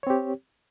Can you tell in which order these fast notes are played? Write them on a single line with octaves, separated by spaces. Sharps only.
C#5 C4 G4